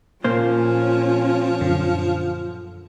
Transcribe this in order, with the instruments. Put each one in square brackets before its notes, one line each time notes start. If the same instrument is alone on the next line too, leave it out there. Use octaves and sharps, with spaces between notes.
[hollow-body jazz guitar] A#2 A#3 C5 [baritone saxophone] F3 [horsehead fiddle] C#4 F4
[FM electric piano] F#2 D3